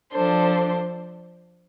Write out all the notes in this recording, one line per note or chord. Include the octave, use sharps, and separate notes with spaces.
F3 D4 A4 C5